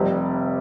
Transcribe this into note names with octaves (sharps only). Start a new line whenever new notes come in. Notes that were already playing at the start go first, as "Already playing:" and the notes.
Already playing: F1 C3 G3